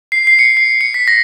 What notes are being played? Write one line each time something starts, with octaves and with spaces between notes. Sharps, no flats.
C7
C7
C#7
C7
C#7
B6
A#6